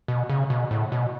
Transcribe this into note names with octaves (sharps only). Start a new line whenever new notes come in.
B2
C#3
B2
A2
B2